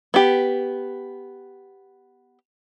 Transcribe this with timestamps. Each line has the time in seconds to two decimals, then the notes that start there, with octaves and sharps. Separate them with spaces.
0.14 B3 G4